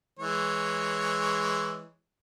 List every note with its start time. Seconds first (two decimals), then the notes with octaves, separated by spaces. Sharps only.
0.19 E3 G#3 C#5